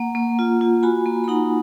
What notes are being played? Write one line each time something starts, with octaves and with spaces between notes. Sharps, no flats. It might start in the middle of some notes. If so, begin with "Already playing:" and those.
Already playing: A#3 F#5 A#5
A#3
F4
F4
F#4 G#5 B5
A#3
B5
D#4 F#5 A#5